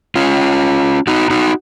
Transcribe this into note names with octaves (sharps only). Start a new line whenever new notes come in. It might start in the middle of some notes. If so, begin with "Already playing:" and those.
C#4 F4
D#4 F#4
D#4 F#4